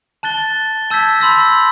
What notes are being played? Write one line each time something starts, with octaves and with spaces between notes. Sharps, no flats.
A5 F#6 A6 G7
A5 E6 G6 G#6 B6
B5 C6 E6 A#6